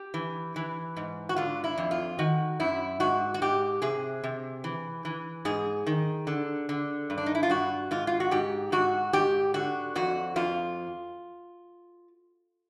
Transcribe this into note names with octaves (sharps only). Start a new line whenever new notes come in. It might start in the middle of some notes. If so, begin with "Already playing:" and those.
Already playing: G4
E3
E3
G#2
F#4
D3 F4
E4
F2
F4
D#3 F#4
F#2 E4
G#2 F#4
F#4
G#2 G4
C3 G#4
C3
E3
E3
G#2 G#4
D#3
D3
D3
G2
D4
D#4
E4
F4
G2 F#4
G#2 F4
F4
F#4
G#2 G4
G#2 F#4
G#2 G4
D3 F#4
F2 F#4
F2 F4